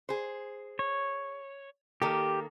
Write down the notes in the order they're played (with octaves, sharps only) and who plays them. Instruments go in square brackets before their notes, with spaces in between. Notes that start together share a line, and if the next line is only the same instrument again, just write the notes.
[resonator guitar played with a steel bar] G#4 C5
[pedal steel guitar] C#5
[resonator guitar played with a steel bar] D#3 A#3 A4 [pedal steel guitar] G4